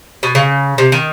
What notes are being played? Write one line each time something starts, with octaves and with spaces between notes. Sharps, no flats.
B2
C#3
C3
D#3